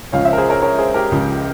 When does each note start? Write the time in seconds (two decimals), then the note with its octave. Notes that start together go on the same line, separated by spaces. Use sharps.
0.12 C#2 C#3 F3 C#5 F5
0.25 C5 E5
0.33 A#4
0.38 G#4 C5
0.50 A#4 C#5
0.62 A#4 C#5
0.78 G#4 C5
0.94 G4 A#4
1.11 C#2 C#3 F3